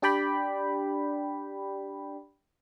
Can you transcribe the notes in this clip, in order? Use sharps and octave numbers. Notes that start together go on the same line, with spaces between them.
D4 G4 D5 G5 B5